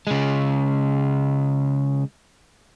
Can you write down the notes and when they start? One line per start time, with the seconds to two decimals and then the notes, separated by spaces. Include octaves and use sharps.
0.07 C#3 G#3